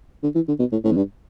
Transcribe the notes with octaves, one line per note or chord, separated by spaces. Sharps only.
D3
E3
D3
B2
A2
A2
E2
G2